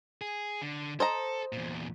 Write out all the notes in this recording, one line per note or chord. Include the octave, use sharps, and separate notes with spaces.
G#4
D3
A4 C5 D#5 A#5
E2 A#2